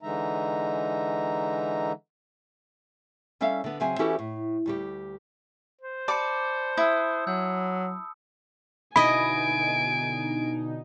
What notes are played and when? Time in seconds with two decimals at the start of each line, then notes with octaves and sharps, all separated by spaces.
0.02 D3 E3 G#3 D#4 E5 A#5
3.41 G3 C#4 A4 E5 F5
3.64 D3 B3
3.80 C#3 F#3 C4 E5 G#5
3.99 E3 C#4 E4 F#4 G4 A4
4.19 A2
4.66 D2 G3 G4
5.81 C5
6.08 D5 A5 B5 D6 C#7
6.77 E4 D#6 E6
7.27 F#3 E6 G6
8.96 B2 D3 D#4 E4 D#5 G#5 B5 D7